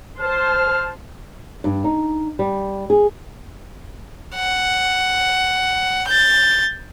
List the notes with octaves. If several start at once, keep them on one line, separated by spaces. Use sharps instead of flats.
C5 A5 F6
G2
D#4
G3
G#4
F#5
G6 A6